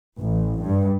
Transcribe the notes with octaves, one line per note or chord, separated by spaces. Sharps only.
A1
G2